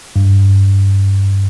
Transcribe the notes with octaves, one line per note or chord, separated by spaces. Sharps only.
G2